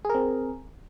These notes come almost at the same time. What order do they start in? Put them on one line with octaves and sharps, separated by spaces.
G#4 A#4 C4